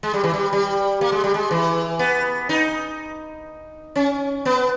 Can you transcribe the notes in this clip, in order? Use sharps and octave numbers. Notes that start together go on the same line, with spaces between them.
G#3
G3
E3
G3
G3
A#3
G#3
G3
G#3
E3
B3
D#4
C#4
B3